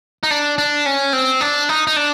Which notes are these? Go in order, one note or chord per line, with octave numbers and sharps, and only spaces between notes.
D#4
D4
D4
C#4
C4
D4
D#4
D#4
D4